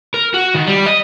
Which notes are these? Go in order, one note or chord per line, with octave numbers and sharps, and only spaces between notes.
A#4
F#4
D#3
G3
D#5